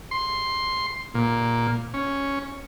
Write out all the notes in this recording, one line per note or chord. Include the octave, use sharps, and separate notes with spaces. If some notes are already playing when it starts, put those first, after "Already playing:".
C6
A#2
C#4